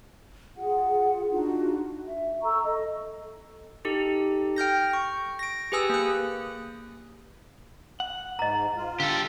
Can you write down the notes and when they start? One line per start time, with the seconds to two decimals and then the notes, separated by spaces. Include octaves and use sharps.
0.57 F4 G#4 F#5
1.30 D4 D#4 F4 F#4
2.03 E5
2.43 A4 A#5 C#6 E6
2.64 A4 D#5
3.85 D#4 G4 A4
4.56 G5 F6 G6 A#6
4.93 C#6
5.39 A#6 D7
5.72 G4 G#4 B4 G#5 D#6 E6
5.89 A#3 F#6
8.00 F#5
8.39 G#2 D#5 A#5
8.77 F4
9.00 D3 G4 A4